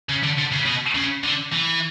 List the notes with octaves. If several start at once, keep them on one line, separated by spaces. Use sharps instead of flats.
C#3
D3
D3
C#3
B2
C#3
D3
E3